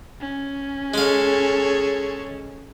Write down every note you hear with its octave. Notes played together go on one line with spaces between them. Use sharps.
C#4
G#3 G#4 A4 C#5 F5